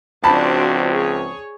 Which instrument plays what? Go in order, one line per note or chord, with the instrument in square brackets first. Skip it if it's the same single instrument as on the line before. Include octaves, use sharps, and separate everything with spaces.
[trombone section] C#2 F3 C4 [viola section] D4 F#4 C5 [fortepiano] A5 B5
[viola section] G#4 C#5